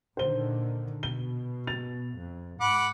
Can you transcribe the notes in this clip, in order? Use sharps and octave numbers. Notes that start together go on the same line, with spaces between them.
A#2 D3 D#3 C5 G7
B2 G7
A6 F7
F2
G#2 F#5 B5 D6